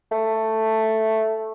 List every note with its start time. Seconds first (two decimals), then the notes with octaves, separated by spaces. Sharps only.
0.11 A3